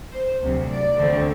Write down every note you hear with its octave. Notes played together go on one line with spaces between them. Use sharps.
C5
D2 C3 F#3
D5
D2 D3 A3 C4